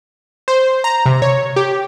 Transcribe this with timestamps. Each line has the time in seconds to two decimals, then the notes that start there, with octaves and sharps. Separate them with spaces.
0.48 C5
0.84 A#5
1.06 C3
1.22 C#5
1.56 G4